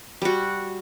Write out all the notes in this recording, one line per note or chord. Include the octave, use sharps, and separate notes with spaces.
G3 F#4